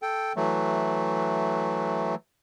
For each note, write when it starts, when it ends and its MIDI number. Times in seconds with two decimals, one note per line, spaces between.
0.02 0.33 69
0.02 0.33 79
0.36 2.15 52
0.36 2.15 54
0.36 2.15 57